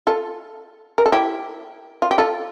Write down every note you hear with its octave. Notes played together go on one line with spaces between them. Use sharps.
F4 A4
A#4
A4
E4 G4
F4
G4
F4 A4